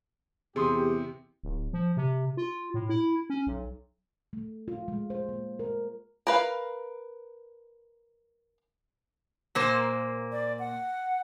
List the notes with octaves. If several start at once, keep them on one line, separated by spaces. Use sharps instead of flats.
E2 C3 G4 G#4 C6 D#6
D1
F3
C3
F4
A2
E4
C#4
B1
A3
F4
G#3
C5
A#3
A#4
A#4 B4 F5
A#2 A#3 C5
D5
F#5